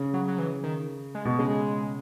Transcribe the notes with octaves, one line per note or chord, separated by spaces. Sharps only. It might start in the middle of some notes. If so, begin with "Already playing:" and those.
Already playing: C#3
F#3
F#3
E3
D#3
G#3
B2
C#3 G#3